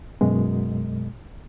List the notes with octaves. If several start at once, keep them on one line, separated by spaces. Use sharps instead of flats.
F#2 B2 G#3